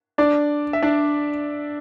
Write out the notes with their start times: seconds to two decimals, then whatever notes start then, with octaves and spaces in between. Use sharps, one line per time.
0.18 D4 D5
0.73 E5
0.82 D4 D5